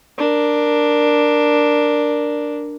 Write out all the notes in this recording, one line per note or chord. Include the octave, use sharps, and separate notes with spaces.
D4 A#4